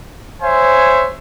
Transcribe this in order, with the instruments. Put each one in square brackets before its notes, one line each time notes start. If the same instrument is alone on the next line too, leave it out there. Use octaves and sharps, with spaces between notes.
[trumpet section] C5 C#5 E5 G#5